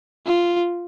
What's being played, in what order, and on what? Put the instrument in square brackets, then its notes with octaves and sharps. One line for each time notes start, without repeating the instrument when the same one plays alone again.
[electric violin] F4